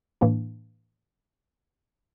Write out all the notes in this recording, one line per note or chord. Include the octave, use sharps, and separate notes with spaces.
A2 E3 A#3 D4